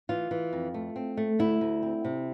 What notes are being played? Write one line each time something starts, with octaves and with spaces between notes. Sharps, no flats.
E3 F4
E3
F2
A3
C4
A3
D2 E4
D2
C4
C3